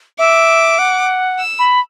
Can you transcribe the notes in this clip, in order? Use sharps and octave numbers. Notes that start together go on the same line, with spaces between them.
E5 D6
F#5
E6
B5